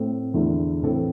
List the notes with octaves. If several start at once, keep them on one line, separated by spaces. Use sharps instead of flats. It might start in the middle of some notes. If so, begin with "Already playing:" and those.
Already playing: A2 A3 C4
E2 D3 A3 E4
A2 E3 C4 A4